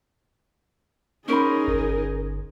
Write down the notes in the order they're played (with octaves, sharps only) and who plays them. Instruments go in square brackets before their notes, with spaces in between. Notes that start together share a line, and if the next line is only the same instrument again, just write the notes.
[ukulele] C#4 C5 B5 [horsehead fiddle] D#4 G#4 [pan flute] A#4
[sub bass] G1